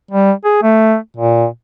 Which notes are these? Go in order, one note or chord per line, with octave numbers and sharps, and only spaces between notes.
G3
G#4
A3
A#2